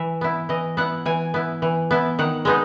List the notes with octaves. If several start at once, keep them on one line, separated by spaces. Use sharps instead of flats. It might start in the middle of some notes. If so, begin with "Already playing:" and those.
Already playing: E3 E5
B3 E4
E3 D#5
B3 E4 F#5
E3 G#5
B3 E4
E3
B3 E4
D#3 F#5
G#3 B3 D#4